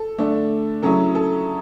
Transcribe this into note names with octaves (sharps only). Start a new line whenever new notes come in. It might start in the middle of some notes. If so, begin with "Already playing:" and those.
Already playing: A4
D3 A3 D4
C#3 F#3 C#4 E4 A4
A4